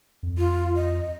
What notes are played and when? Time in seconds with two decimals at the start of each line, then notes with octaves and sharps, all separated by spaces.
0.23 F2
0.38 F4
0.76 D#5